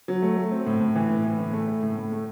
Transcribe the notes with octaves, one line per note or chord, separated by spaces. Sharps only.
F#3
A3
A3
C4
A2
A2
E3
A2
E3
A2
A3
A3
A2
A2
A3